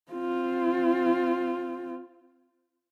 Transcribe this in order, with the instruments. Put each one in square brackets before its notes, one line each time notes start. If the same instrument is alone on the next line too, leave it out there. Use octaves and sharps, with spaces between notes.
[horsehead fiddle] C4 F4